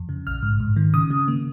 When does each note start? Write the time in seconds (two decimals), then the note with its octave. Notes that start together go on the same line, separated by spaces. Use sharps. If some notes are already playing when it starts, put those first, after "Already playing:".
Already playing: F2
0.09 C#3
0.27 A#1 F6
0.43 G#2
0.60 G#2
0.76 D#3
0.94 C#3 D#6
1.10 C#3
1.28 A#3